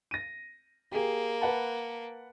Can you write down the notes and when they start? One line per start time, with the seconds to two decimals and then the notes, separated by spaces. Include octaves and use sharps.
0.11 A#6 D#7
0.92 A#3 G4 G#4
1.41 B4 F#5 A5